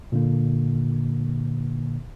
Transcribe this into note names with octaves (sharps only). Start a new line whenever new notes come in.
A#2 D3 A#3